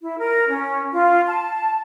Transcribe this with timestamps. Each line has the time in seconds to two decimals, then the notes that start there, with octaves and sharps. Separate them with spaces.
0.02 E4
0.19 A#4
0.49 C#4
0.93 F4
1.26 A5